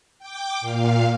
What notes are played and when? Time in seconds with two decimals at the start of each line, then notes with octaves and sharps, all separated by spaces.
0.19 G5 D6
0.61 A#2 F5